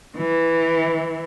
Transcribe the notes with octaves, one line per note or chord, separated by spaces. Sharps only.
E3